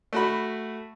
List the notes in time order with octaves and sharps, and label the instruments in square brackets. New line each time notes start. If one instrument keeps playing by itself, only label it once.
[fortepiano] A3 F#4 B5